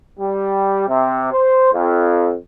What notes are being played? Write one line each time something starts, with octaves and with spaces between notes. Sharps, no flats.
G3
C3
C5
F2